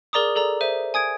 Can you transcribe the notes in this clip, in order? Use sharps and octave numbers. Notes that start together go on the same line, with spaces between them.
G#4 A#4 D5 A#5 D6 D#6
G#4 A4 D5 A#5
C5 E5 D#7
G#5 D#6 G#6 D7